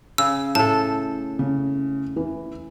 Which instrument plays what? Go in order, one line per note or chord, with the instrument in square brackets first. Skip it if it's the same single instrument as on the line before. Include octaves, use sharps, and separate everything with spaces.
[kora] C#3 [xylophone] E6
[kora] A2 A4 [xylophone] A5
[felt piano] C#3
E3